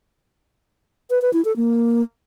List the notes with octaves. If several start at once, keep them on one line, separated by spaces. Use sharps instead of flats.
B4
B4
E4
A4
A#3